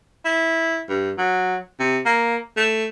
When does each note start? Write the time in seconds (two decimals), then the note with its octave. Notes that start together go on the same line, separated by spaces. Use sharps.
0.25 E4
0.89 G2
1.18 F#3
1.79 C3
2.05 A#3
2.57 A3